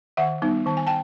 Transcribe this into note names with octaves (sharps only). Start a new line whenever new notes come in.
D#3 E5 F#5
G3 B3 D#4
D#3 A5
G#5
G5 A5